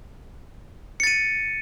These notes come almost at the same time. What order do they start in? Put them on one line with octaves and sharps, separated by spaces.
C#7 A6 D#7